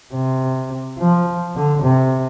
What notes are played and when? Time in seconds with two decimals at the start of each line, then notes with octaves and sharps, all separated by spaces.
0.14 C3
0.99 F3
1.55 D3
1.83 C3